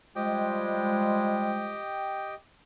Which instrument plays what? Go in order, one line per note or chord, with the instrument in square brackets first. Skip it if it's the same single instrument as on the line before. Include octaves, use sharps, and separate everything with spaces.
[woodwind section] F3 G3 G#3 [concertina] G4 D#5 G5